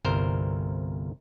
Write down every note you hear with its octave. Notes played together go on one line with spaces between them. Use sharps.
G1 C2 A#4 C5